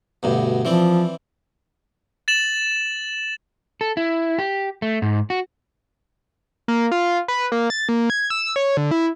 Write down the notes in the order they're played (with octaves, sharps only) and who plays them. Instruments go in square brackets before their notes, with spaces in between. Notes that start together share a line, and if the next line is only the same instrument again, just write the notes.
[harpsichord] D2 G2 B2
[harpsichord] E3 C4 D5 [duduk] F3
[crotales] A6 E7 F#7
[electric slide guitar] A4
E4
G4
A3
G#2
F#4
[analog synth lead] A#3
F4
B4
A#3
A6
A#3
G#6
E6
C#5
D3
E4